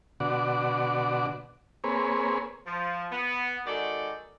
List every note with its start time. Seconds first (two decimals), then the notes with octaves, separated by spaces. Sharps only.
0.20 B2 D3 F#4 D5
1.84 A#3 C4 G#4 B4 C#5
2.67 F3
3.12 B3
3.67 D#3 G#3 F#4 A4 D5